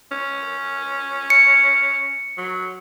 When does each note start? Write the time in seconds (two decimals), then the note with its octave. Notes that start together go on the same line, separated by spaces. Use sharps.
0.12 C#4
1.30 C#7
2.38 F#3